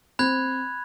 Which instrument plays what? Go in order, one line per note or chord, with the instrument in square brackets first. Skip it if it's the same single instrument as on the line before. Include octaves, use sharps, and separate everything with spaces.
[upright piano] C4 [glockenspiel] B5 F#6 G#6